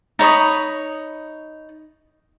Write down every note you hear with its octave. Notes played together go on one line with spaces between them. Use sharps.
D#4 C#5 B5 D#6